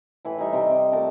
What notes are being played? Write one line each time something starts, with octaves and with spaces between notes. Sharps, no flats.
A2 E3 B4 B5
E3 G3 D#4 E5
C3 D#5 G5 D6
C4
F3 A3 A#4 A5